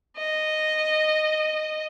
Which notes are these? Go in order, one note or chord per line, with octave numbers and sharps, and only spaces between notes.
D#5